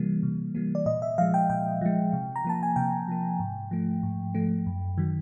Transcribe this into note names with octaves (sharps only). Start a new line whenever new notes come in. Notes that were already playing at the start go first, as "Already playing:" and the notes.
Already playing: C3 E3 G3 A#3
C3
E3 G3 A#3
D5
A#2 D#5
E5
F3 G#3 F5
G5
A#2 G5
F3 G#3
C3
A#5
F3 A#3 A5
G#5
C3 G5
F3 A#3
G#2
F3 A3
G#2
F3 A3
F#2
D#3 F#3